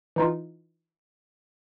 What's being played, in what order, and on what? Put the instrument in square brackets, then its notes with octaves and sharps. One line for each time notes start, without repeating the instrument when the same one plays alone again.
[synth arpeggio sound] E3 D#4 F4